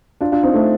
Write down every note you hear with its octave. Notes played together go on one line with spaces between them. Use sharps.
D4 F4
D4 F4
C4 D#4
A3 C4